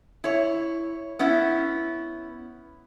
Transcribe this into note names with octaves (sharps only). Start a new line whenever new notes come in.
E4 C#5
B3 C#4 E4